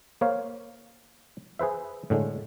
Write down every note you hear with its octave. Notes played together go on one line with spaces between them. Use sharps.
A#3 C5 C#5 F5
G#4 B4 C5 E5
A2 D3 G#3